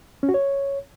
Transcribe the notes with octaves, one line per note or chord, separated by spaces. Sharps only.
C#4
F#4
C#5